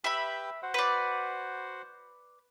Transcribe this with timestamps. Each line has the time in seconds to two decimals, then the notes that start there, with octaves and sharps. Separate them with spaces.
0.04 G4 B4 E5 G5 B5
0.63 F#4 C5 F#5
0.74 B4 D5